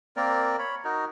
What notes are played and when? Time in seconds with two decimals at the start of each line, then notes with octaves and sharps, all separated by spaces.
0.16 A#3 C4 A#4 D5
0.59 C#5 B5
0.84 D#4 F#4 A#4